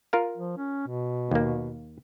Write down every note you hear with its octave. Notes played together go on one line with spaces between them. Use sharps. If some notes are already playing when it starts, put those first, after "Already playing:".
F4 A#4 F5
F3
C#4
B2
D#2 A#3